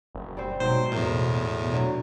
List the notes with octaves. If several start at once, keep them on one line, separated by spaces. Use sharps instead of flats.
F#1
G3 C4 C5
G#2 B2 F#3 C5 G5
E2 A2 A#4
D3 F#3